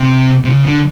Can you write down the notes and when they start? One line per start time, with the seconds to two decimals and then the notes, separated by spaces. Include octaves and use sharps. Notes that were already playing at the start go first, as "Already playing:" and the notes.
Already playing: C3
0.45 C3
0.50 C#3
0.66 D3